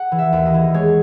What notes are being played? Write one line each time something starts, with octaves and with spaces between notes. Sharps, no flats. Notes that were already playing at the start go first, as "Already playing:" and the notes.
Already playing: F#5
E3
E5
D#2
D#5
E3
G#3 C#5